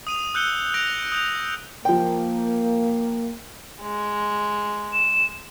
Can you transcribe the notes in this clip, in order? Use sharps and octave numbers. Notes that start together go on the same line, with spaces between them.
D#6 D#7 F7
E6 F#6 G6 C#7 G7
D#6 G6 A#6 D7 F7
D#6 G6 F7
F3 A#3 G5
G#3
E7